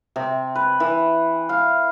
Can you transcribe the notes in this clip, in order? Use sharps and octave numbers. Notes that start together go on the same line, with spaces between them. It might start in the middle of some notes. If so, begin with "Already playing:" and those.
C3
B4
E3
F5